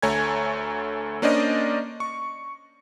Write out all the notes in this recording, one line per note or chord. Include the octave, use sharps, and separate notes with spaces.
D2 A3 C#5 G#5 A#5 G#6
A#3 C#4 D4 C5 D5 D#5
C#6